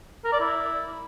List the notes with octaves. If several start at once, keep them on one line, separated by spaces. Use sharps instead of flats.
A#4
D5
E4